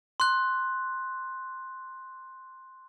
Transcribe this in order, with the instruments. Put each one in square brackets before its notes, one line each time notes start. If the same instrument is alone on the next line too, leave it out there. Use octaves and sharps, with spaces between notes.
[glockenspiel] C6 F#6